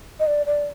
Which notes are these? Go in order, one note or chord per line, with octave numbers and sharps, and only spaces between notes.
D#5
D5
D5